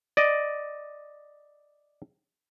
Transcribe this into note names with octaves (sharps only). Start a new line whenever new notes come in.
D5 D#5